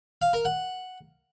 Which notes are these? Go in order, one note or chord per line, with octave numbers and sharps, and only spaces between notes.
F5
A#4
F#5